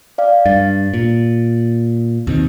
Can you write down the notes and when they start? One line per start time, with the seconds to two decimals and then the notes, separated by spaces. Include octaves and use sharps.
0.18 D5 F5
0.46 G2 A6
0.94 A#2
2.27 D#2 C3 D#3